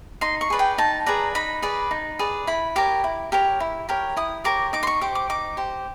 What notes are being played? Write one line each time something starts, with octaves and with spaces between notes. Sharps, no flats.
D#4 C6
C#6
G#4 B4 D5
G5
D#4 A5
G#4 B4 D5 A#5
D#4 B5
G#4 B4 D5
D#4
G#4 B4 D5
E4 B5
G4 A#4 C#5 D6
E4
G4 A#4 C#5
E4
G4 A#4 C#5
E4 D#6
G4 A#4 C#5 D6
D#4 D6
C6
C#6
G4 C5 D6
D6
D#4 D6
G4 C5